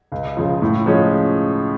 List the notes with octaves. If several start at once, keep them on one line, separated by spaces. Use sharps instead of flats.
C#2
C#3 F3
A2
F3 G#3 C#4